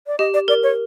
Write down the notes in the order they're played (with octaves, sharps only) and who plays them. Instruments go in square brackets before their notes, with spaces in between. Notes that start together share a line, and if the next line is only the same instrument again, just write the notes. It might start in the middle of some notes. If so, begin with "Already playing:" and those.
[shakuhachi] D5
[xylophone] G4 [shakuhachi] D#5
[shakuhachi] D5
[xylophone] A#4 [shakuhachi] D5
[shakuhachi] C#5